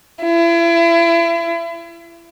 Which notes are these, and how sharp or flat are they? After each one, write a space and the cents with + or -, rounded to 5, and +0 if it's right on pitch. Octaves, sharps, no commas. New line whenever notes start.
E4 +35